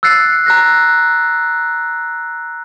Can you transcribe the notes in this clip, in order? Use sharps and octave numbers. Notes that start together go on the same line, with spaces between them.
E6 F#6 A6 C7 C#7
A#5 F#6 A#6